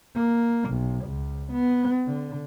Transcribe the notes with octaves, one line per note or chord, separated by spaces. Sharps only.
A#3
B1
C#2
B3
D3